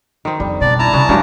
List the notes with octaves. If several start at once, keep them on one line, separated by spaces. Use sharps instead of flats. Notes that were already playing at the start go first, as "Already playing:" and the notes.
D#3 C4
F2 G3 D4
B2 D4 D5
E4 A5 A#5
C3 B3 C#4
G2 F#3 G#3 C#4 D4 G4 B4